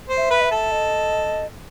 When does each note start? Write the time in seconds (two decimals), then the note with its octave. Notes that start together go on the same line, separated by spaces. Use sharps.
0.09 C5
0.17 E5
0.31 B4
0.41 D#5
0.44 E5
0.51 A4
0.71 D#5